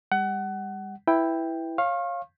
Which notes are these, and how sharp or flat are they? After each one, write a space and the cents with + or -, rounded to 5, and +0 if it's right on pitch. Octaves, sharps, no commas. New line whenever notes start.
G3 +35 F#5 +25
E4 +0 B4 +0 G5 +5
C#5 -15 F5 +0 C#6 -40